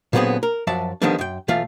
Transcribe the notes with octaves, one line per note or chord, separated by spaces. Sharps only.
A#2 D3 F#3 B3 C4 G#4
A#4
F#2 F3 F#4 D5 E5 A5
D3 D#3 F3 G3 B3 D4
F#2 G5
B1 E3 A3 F4 F5